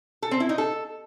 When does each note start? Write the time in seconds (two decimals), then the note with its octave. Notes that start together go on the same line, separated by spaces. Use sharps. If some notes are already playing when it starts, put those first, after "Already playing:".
0.22 A4
0.31 C4
0.40 E4
0.49 D#4
0.58 A4